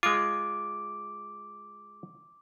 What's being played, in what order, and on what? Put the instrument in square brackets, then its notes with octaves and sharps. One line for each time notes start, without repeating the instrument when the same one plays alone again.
[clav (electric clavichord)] G#3 F4 [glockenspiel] D6 D7